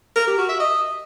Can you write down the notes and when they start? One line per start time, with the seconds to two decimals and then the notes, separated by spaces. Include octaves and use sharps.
0.16 A#4
0.27 G4
0.38 F#4
0.49 E5
0.60 D#5